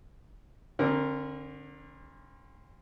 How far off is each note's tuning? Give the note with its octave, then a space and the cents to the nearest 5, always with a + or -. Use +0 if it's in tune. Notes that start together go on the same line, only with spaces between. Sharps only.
D3 +0 C4 +45 A#4 +0